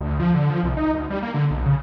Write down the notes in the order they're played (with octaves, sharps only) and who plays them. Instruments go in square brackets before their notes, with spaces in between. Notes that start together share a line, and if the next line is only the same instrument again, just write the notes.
[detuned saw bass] D2
F3
D3
F3
C2
D#4
D2
G3
A#3
D3
B1
C#3